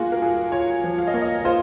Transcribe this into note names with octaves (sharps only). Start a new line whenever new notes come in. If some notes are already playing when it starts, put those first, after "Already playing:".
Already playing: A#3 F4 F#4 G#4
A#4
F4 G#4
F4 C#5
F3
F5
D#5
A#3 C#5
D#5
F4 C5